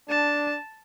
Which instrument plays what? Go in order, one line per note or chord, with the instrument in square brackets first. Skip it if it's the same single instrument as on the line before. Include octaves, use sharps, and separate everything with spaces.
[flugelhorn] D4 [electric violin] A5